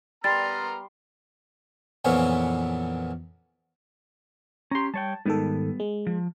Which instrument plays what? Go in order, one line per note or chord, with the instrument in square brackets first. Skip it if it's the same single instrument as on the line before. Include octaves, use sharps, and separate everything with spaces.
[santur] G3 [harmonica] B3 A#5 F6 [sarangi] C6 [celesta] A6
[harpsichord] F2 A#2 E3 A#3 B3 C#4
[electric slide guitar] C#4 G4 [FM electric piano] A#5 C6
[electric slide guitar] G3 C#5 G5 [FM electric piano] A5
[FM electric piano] G#2 D#3 A4 [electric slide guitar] G3 B3
[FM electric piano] G#3
[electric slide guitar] F3